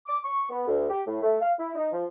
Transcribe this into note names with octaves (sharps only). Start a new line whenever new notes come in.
D6
C#6
B3
D2
G4
A2
A3
F5
E4
D#4
F3